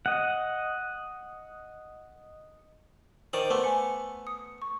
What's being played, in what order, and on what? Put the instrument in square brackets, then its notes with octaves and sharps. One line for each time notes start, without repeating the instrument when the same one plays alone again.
[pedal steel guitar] D#5 F#5
[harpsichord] D#3 D5 D#6 [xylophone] C5
[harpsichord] A3 B3 [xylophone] C6 D6
[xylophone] G#5 C#7
D#6 C#7
C#6